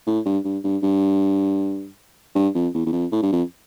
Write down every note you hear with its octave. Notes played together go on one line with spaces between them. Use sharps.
A2
G2
G2
G2
G2
G2
F2
E2
E2
F2
A2
G2
F2